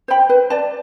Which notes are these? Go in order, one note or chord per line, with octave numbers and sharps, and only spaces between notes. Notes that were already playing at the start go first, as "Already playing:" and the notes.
C5 G5 B5
B4
D5 A5